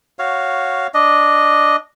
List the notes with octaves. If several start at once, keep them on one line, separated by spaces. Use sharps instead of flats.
F#4 C#5 F5
D4 D#5